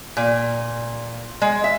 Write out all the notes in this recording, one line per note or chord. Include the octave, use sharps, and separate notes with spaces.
A#2
G#3
E5